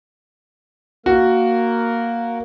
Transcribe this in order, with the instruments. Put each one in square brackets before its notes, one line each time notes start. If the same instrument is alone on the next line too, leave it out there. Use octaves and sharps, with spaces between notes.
[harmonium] A#3 A#4 [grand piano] F#4